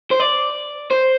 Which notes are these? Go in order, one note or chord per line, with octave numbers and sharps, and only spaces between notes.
C5
D5
C5